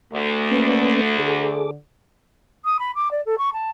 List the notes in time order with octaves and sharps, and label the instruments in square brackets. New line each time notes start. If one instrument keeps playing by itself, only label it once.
[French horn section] D2 [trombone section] A3
[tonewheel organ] A#3 C#4 B4
[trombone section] D3 [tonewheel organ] G#4 A4 D6
[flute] D#6
B5
D6
D5
A4
C#6
A5